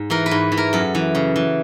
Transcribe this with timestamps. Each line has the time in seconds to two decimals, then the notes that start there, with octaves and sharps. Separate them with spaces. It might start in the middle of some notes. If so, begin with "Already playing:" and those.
Already playing: G#2
0.10 E3 A#4
0.26 B4
0.31 G#2
0.52 E3
0.57 A#4
0.73 F#2 A4
0.95 E3
1.15 C#3
1.36 E3